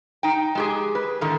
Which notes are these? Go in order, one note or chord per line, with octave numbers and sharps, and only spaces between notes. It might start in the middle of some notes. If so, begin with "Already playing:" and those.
D#4 G5
G#3 G4 G#4
B4
A2 D3 D#3 A3